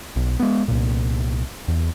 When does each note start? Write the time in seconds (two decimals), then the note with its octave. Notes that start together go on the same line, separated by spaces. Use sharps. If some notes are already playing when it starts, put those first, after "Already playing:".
0.16 B1
0.39 G#3 B3
0.68 C2 A#2
1.68 E2